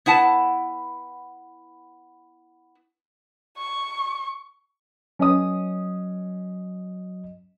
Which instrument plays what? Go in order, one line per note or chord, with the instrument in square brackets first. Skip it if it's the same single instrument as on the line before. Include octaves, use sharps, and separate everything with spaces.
[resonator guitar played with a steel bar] B3 E4 F#5 A5
[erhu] C#6
[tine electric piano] F#3 D#5 [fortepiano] C#4 D#6